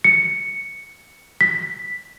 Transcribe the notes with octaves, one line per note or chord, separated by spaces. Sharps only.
C#7
B6